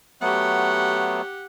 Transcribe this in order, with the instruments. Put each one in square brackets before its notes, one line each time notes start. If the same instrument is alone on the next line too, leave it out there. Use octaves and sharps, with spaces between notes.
[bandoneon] F#3 A3 B3 [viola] G4 F#5